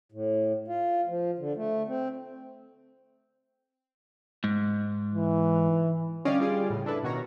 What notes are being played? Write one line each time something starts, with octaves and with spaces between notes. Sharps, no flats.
A2
F4
F3
D3
A3
C4
G#2
E3
D3 G3 C#4 D5 D#5 F5
G3 F4 G#4 D5
A2 C#3
D4 E4 A4 B4
B2 D#3 F#4 C#5 A#5